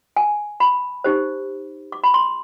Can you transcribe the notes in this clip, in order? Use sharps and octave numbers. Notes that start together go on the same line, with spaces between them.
G#5
B5
D#4 G4 C5
D6
B5
C6